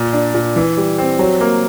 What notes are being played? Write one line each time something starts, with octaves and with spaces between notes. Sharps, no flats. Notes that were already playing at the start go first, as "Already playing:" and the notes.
Already playing: A#2
D4
A#2
E3
G3
C4
F#3
A#3